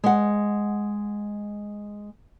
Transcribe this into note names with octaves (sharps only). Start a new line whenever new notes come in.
G#3 F#5